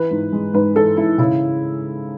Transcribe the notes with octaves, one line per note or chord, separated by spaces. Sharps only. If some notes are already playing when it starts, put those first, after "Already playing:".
Already playing: E3 B4
G#2
G#3
G#2 B4
E3 A4
G#2 E4
C#3 E4